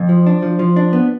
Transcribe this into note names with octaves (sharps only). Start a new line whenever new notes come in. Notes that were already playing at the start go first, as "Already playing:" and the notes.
Already playing: F2
F3
D4
F3
F3
D4
B3